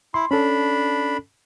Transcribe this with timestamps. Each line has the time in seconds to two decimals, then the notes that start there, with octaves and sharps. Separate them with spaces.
0.14 E4 C6
0.31 C#4 D4 A4 B5